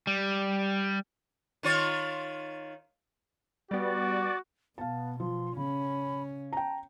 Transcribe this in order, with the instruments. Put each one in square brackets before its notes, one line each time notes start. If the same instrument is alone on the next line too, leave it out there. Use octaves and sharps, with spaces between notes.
[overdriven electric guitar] G3
[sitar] D#3 F4 C#5
[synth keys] G3 B3 [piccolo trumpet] F#4 [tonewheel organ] D5
[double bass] B2 [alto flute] B3 [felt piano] F5 A5
[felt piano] F3 [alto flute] C6
[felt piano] C#3 [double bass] C#4 [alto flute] B5
[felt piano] G5 A#5 [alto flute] A5